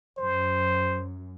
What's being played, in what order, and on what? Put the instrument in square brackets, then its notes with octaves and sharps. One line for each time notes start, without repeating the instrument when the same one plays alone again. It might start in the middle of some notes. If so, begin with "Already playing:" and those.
[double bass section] F#2 [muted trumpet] C5